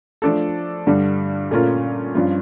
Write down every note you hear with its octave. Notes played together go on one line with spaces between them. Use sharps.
F3 A3 D4 A4
G2 D3 G3
A#2 A3 C#4 F4 A#4
G2 F3 C#4 F4